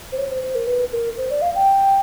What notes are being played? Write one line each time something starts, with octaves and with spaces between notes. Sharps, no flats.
C5
C#5
C5
C5
A#4
B4
A#4
C5
D5
F5
G5